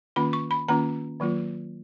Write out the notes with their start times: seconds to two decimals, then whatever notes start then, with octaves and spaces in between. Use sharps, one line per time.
0.16 D#3 A#3 C#4 F4 B5
0.33 C#6
0.51 B5
0.68 D#3 A#3 C#4 F4 A#5
1.20 D#3 F#3 A#3 F4